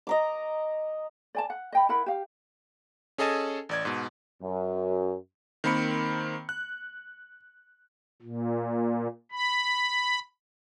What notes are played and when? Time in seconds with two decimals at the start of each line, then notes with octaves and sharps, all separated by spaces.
0.07 D#5 A#5 D6
1.35 D5 G#5 A5
1.50 F#5
1.72 D#5 G5 B5
1.89 E4 A#4 F#5 B5
2.06 G4 F5
3.18 C#4 G#4 A4 D#5 G#5 A5
3.69 A1 D5 G#6
3.85 G#2 B2
4.41 F#2
5.64 D#3 A#3 C4 B5 C#7
6.49 F#6
8.22 A#2
9.32 B5